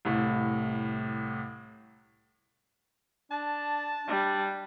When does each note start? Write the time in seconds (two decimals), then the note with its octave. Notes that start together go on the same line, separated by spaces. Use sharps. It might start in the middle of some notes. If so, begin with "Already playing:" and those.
0.05 C2 A2
3.31 D4 A5
4.07 G3 D4